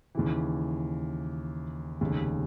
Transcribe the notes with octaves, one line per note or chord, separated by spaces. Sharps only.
D#2 C#3 E3
F1 D#2 C#3